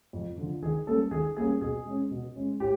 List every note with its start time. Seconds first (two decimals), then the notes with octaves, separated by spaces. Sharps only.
0.13 F2
0.38 D3 F3
0.62 D#3 G#4
0.87 G3 A#3 C#4 A4
1.11 D#3 G#4
1.37 G3 A#3 C#4 G#4
1.61 B2 G#4
1.86 G#3 C#4
2.11 B2
2.35 G#3 C#4
2.60 A2 G4